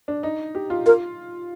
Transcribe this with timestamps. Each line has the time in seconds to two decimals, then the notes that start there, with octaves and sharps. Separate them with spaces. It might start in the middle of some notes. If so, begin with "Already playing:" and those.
0.08 D4
0.23 D#4
0.55 G4
0.70 F4
0.86 F4 A#4